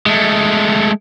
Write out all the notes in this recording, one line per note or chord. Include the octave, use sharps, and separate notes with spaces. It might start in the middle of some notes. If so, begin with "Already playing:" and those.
G#3 A3